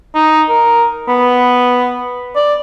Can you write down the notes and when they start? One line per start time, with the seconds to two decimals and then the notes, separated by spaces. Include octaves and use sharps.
0.15 D#4
0.49 A#4
1.08 B3
2.36 D5